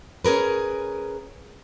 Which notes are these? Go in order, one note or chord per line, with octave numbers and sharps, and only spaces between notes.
C#4 G#4 A#4 B4